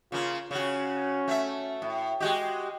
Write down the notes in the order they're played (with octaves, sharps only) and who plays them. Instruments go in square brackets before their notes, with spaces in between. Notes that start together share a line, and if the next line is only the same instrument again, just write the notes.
[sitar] C#3 A#3 [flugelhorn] F4
[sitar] C#3 F#4 [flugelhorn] C#4
[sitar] A3 E5
A2
[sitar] G#3 F#4 G4 [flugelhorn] D#5